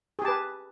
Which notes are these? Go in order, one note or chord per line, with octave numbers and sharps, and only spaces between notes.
G4 G#4 B4 A5